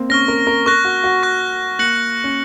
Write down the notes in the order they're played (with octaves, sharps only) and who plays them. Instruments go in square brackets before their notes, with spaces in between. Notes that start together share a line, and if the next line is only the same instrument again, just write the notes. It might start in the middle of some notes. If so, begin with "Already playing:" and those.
Already playing: [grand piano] A#3 C4
[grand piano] C#4 [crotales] C#6 F6 A#6
[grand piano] A#4
A#4
[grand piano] A#4 [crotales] C#6 F#6 A#6
[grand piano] F#4
F#4
[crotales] C#6 F#6 A#6
[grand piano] A#3 [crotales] F#6 A#6 C#7 F#7
[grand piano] C#4